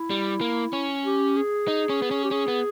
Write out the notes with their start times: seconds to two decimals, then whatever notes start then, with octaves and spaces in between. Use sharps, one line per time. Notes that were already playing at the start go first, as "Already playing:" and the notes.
Already playing: E4
0.10 G3
0.41 A#3
0.73 C#4
1.05 G4
1.36 G#4
1.68 D#4
1.89 C#4
2.02 B3
2.11 C#4
2.24 G4
2.31 C#4 G#4
2.48 B3